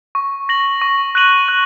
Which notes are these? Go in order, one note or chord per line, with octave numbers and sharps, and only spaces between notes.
C#6
A#6 F#7
C#6
F#6 D#7 F#7
F#6